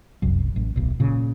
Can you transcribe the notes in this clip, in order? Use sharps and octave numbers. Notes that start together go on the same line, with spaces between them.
F1 C2 F#2
A1
D1 B1
A#2 C#3